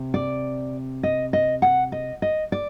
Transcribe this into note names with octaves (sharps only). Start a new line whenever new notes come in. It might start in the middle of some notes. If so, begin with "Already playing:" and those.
Already playing: C3
D5
D#5
D#5
F#5
D#5
D#5
D5